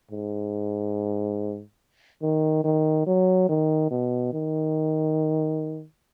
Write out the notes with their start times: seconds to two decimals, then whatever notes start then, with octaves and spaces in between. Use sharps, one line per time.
0.11 G#2
2.23 D#3
2.64 D#3
3.07 F#3
3.49 D#3
3.91 B2
4.33 D#3